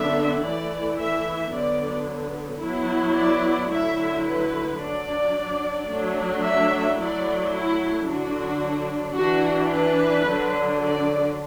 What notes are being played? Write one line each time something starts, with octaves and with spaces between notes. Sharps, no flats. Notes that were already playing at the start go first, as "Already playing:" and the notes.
Already playing: D3 F#3 B3 D4 E5
E3 A3 E4 D5
E5
D3 F#3 B3 D5
F#3 B3 E4
D5
D3 F#3 A3 E4 E5
B4
F#3 D4 D5
F#3 A3 D4
E5
F#3 A3 E4 D5
E4
D3 F#3 D4 F#4
E3 D4 F#4
B4
D3 F#3 D4
D5